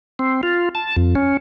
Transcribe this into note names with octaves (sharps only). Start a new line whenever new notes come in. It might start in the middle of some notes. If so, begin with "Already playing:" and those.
C4
F4
A5
F2
C#4